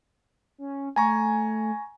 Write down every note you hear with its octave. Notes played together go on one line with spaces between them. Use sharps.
C#4
A3 G#5 A#5 C#6